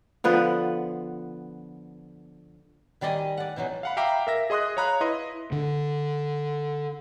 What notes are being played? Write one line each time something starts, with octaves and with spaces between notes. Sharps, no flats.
D3 F3 B3 B4
D#3 G3 D5 D#5 G#5
D5 F#5
B2 E3 F#3 D#4
F5 F#5 B5
E5 F5 G5 A#5 D6 C7
A#4 E5 A#6
G#4 D#5 C6 D#6 F#6
C#5 F5 A#5 B5 F#6
E4 B4 D#5 C6
D3